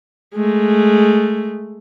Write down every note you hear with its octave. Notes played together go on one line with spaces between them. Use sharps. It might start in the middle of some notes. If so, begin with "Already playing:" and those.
G#3 A3